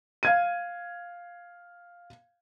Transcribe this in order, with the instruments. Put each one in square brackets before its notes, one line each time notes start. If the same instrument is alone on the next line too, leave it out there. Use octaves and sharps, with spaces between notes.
[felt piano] F5 G#6 D#7